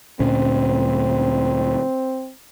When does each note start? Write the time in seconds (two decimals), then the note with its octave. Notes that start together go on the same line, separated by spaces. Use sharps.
0.20 D2 A#2 C4 C#4